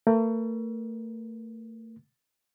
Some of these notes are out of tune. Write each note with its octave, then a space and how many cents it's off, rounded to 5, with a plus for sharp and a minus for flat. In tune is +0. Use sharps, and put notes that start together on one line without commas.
A3 +40 A#4 +40